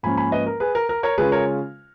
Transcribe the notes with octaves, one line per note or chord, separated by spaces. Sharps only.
G#2 F3 A#3 C#4 G#5 B5
G#5 B5
B4 D#5
A#4
G#4 B4
A#4
A#4
A#4 C#5
C#3 G#3 C#4 F4 G#4 B4
A#4 C#5